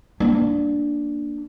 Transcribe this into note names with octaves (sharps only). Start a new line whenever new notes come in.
A#3 D4